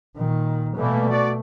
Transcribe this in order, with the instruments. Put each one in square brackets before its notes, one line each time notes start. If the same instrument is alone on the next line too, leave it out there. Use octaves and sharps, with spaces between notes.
[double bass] A#2 D#3
[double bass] B2 A3 [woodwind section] E3 G3 A#3
[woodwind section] F#4 D5